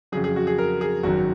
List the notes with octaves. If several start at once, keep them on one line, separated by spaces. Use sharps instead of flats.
F2 C#3 F#3 G#4
G#4
F#4
G#4
A#4
G#4
G#1 F#2 D#3 F#3 F#4